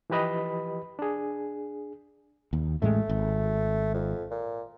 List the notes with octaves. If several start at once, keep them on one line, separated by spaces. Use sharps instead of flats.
E3 F3 G4 B4 D#5 B5
D4 G#4
D#2
A1 A2 G#3 A3
G#1
F2
A#2